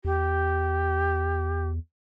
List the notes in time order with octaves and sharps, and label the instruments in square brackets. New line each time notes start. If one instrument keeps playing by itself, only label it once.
[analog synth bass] E2 [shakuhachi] G4